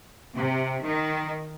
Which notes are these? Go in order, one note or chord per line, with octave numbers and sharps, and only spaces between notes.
C3
D#3